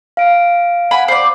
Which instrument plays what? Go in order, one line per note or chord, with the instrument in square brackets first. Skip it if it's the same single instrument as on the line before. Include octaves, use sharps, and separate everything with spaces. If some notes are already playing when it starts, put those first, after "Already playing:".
[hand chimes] F5 D7
[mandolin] F#5 G#5 B5
C5 D5